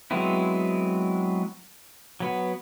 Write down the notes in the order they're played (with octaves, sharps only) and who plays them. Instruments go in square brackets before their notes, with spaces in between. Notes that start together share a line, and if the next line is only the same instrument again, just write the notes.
[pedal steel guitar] F#3 G#3 B3 C4 E4
F#3 B3